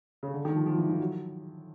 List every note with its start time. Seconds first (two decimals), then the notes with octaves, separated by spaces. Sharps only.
0.23 C#3
0.34 D3
0.45 D#3
0.56 F3
0.66 F3
0.78 E3
0.89 E3
1.00 F#3